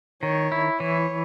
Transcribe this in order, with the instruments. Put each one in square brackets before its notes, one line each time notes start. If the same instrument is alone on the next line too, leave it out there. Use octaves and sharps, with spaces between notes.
[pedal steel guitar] D#3 [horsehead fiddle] C#5
[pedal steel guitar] E4
[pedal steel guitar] E3 [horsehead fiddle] C#5